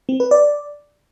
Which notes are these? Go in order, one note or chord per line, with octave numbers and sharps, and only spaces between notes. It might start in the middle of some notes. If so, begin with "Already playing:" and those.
C4
B4
D5